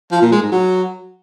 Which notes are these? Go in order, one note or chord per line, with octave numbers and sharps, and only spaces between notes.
F3
A#2
G#3
G#2
F#3